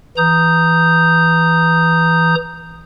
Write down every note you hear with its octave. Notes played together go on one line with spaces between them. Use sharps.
E3 A#5 D#6 G6